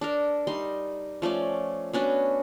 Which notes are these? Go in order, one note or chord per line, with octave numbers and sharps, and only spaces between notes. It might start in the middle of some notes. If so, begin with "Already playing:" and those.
D4 A4 A#4
G3 D#4 C6
F3 A3 C#4 D5
B3 C#4 D4 F#4